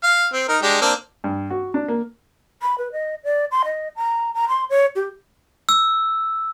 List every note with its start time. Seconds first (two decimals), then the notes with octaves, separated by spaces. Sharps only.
0.03 F5
0.33 C4
0.49 D#4 A#4
0.62 G#3 D4 G4
0.81 A#3 C4 D4
1.24 G2
1.50 F#4
1.74 D4
1.88 A#3
2.62 B5
2.78 B4
2.92 D#5
3.24 D5
3.52 C6
3.65 D#5
3.96 A#5
4.34 A#5
4.49 C6
4.70 C#5
4.96 G4
5.69 E6